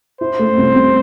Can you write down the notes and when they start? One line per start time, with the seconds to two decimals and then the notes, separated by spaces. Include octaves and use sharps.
0.21 E4 C5
0.39 A3
0.57 C2
0.75 C3